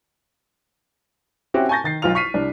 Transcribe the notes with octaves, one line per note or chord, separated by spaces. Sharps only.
C4 C#4 E4 F#4 G4
G#5 A5 C#6 G6 A6 A#6
D#3 A6 C7
B1 F4 F6 F7
C#6 F6 B6 C7 D#7
C2 D4